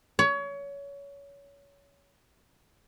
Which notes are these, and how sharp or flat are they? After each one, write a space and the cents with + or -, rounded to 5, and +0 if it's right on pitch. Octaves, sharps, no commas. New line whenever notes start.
C#5 +25